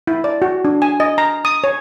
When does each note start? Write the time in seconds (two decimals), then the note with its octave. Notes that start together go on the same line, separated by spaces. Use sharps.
0.07 E4
0.24 D5
0.42 F#4
0.65 D4
0.82 G#5
1.00 D#5
1.18 A#5
1.45 D#6
1.64 C#5